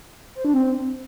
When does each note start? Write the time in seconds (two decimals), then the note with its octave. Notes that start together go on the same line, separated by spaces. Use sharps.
0.35 C5
0.45 D4
0.54 C4